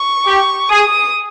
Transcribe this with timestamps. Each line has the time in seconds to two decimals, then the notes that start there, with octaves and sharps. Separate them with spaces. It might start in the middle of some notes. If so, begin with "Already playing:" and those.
Already playing: C#6
0.25 G4
0.69 G#4 D#6